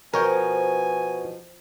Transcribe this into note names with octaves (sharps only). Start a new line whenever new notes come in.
B2 F3 A#4 C#5 G5 G#5